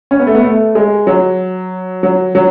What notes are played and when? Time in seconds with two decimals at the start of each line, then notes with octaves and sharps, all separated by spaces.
0.11 C#4
0.19 B3
0.27 A3
0.35 B3
0.43 A3
0.75 G#3
1.07 F#3
2.03 F#3
2.35 F#3